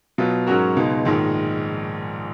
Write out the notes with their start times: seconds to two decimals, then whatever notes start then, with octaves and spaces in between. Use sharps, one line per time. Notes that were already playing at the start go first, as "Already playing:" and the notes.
0.18 B2 F#3 B3 F4
0.47 G#2 F#3 C#4 F#4 A#4
0.76 C#2 B2 G#3 D#4
1.05 A#1 G#2 D#3